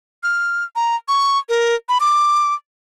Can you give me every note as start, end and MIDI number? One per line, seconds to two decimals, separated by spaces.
0.23 0.64 89
0.76 0.96 82
1.08 1.38 85
1.49 1.75 70
1.89 1.98 83
2.00 2.54 86